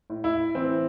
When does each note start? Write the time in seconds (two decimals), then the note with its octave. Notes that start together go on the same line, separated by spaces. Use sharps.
0.10 A2
0.24 E4
0.55 E3 C4